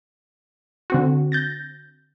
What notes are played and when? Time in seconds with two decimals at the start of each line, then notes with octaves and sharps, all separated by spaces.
0.90 D3 C4 F#4
1.32 G6 A6 A#6